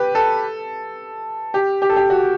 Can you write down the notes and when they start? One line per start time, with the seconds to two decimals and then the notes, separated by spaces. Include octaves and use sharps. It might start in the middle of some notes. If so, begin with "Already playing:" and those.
Already playing: G4 B4
0.15 A4
1.54 G4
1.82 G4
1.89 A4
1.96 G4
2.10 F#4